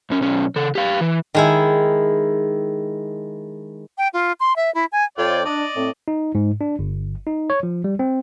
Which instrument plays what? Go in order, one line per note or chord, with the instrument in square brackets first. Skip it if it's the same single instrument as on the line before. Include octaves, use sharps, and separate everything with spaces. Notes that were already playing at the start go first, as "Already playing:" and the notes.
[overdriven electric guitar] F#2 C#4
B1 C#4
C#3 A4
G4 F5
E3
[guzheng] D#3 G#3 E4
[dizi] G5
F4
C6
E5
E4
G#5
[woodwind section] F2 C#5 [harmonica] F4 D5 G5
[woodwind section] D4 [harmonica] D5 D#5
[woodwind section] A2 C4
[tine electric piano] D#4
G#2
D4
G1
D#4
C#5
F3
G3
C4